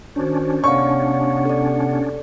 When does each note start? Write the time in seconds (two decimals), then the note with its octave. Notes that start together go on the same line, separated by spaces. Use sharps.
0.16 D#3 C#4 D4 F#4 C5
0.64 C3 B3 C#5 D5 F5 F#5 C#6
1.45 A4 D5